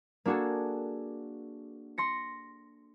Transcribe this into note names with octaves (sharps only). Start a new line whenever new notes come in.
A#3 D4 F#4 G#4 A4
C6 A#6 C#7